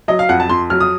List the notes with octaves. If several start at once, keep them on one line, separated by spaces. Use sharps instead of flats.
F#3 D#5
F5
F2 F#5
A5
F2 C6
F#3 F6
D#6